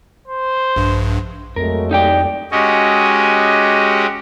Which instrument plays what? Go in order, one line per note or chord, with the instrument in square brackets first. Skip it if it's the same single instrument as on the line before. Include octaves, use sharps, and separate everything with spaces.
[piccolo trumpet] C5
[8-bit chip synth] A#1 G2
[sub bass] F2 [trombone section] F#3 G#3 A3 [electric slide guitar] A#4
[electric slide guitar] D#4 G4 G5 [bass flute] D5
[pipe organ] G#3 C#4 F#4 G4 D#5